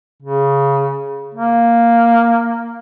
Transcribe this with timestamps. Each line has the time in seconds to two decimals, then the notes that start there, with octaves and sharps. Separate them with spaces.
0.22 C#3
1.35 A#3